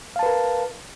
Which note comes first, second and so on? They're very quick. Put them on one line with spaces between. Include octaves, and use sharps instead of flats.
F5 A5 B4 A#4